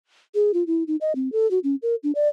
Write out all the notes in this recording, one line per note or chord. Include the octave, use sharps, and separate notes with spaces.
G#4
F4
E4
D#4
D#5
C4
A4
F#4
C#4
A#4
D4
D5